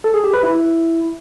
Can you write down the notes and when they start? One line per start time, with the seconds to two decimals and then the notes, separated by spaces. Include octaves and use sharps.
0.04 A4
0.14 G#4
0.24 G4
0.33 B4
0.43 E4